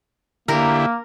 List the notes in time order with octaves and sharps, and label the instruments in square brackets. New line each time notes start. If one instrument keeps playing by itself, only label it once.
[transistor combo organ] D3 E4 G4 [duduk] A#3 [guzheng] A#4